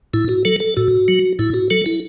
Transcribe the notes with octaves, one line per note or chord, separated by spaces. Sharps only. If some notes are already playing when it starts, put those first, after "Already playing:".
A2 E4
F#4
F#3 A4
A4
A2 F#4
F#3
A2 E4
F#4
F#3 A4
E4